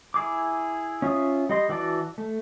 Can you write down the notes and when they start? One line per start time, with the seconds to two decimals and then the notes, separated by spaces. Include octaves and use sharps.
0.14 E4 G#4 D6
1.02 C#4 F4 E5 D#6
1.49 G3 D#5 C6
1.69 E3 F#4 D5 A5
2.18 A3